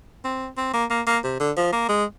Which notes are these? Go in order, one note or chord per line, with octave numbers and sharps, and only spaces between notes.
C4
C4
A#3
A#3
A#3
C3
D3
F3
A#3
G#3